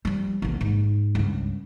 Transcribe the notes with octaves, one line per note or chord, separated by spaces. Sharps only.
F3 G3
A1 D#2
G#2
C#2 G2